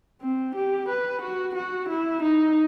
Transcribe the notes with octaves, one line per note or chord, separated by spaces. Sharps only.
C4
G4
B4
F#4
F#4
E4
D#4